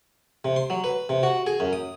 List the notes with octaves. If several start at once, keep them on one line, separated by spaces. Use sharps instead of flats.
C3
C6
F#3
B4
C3
F#4
G#4
F#2
D#6